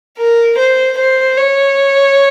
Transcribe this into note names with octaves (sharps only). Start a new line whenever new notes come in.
A#4
C5
C5
C#5